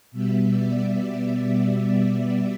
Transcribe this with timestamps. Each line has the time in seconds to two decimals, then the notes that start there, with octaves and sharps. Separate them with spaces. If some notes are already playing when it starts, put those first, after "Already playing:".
0.12 B2 G3 B3 E5
0.50 D5
0.87 D5